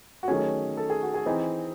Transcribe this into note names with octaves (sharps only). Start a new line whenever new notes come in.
F#4
D#3 F#3 A3 C#4 G#4
A4
G#4
F#4
G#4
E3 C4 D#4